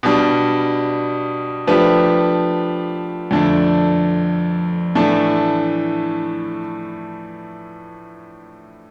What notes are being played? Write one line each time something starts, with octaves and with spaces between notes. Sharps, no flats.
B2 G3 D4
F3 A3 D4 G4 B4
F2 D3 A3 D4
A2 E3 A3 D4